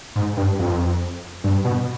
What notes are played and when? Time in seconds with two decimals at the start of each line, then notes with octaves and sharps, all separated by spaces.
0.16 G#2
0.37 G2
0.59 F2
1.44 G2
1.65 B2